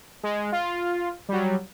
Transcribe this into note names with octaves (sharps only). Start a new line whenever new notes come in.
G#3
F4
F#3 G3